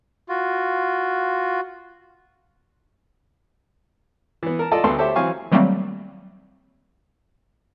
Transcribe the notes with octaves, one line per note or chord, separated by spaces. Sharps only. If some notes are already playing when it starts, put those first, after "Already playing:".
F4 F#4
E3 B3
A#4 A5
F4 A4 D5 D#5 A5
D2 B3 A4 C6
G4 A4 C5 C#5 E5
E3 F#3 C4 F5 G#5 C#6
D#3 F#3 G3 A3 A#3 C4